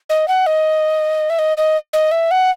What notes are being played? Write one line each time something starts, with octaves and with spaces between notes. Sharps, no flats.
D#5
F#5
D#5
E5
D#5
D#5
D#5
E5
F#5